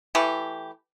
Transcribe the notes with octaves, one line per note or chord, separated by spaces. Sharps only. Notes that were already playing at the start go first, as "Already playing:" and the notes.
E3 A3 G4